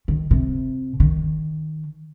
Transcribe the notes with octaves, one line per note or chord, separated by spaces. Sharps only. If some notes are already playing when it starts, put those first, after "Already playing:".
D#3
C3
D#3